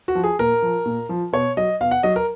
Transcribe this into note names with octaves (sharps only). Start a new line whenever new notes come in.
F#4
F3
G#4
A#2 A#4
F3
A#2
F3
B2 C#5
F#3 D#5
B2 F5
F#5
F#3 D#5
A#4